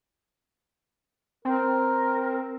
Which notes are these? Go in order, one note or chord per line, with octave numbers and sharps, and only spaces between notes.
C4 A#4